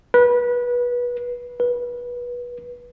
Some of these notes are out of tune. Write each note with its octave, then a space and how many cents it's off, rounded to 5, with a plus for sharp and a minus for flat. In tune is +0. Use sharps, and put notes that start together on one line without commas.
B4 -25
B4 -25